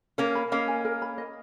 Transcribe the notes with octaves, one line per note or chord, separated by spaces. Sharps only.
A#3 C#4 A#4
B5
A#3 C#4 D#5
G#5
A#4
B5
D#5